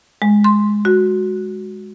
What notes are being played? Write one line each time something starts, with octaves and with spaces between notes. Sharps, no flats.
G#3
C6
F#4